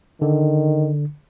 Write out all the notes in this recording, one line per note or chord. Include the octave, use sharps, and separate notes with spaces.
D3 D#3